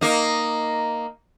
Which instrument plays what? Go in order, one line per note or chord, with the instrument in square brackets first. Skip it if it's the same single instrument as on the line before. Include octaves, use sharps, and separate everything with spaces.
[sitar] A#3 D#4